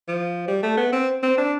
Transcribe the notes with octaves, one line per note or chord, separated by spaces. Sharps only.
F3
G3
A3
B3
C4
C4
D4